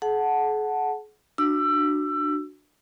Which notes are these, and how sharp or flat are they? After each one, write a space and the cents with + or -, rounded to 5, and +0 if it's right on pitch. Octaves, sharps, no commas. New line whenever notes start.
G#4 +45 F#5 +0 A5 +0
D4 +20 F#4 +0 E6 +25